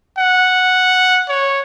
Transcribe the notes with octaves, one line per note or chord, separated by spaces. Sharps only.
F#5
C#5